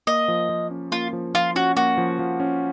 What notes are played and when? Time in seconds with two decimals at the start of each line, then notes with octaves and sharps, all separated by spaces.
0.07 A#3 D#5
0.28 F3
0.49 F3
0.71 C#4
0.92 A#3 F4
1.13 F3
1.35 F3 F4
1.56 C#4 F#4
1.77 A#3 F#4
1.98 F3
2.19 F3
2.40 C#4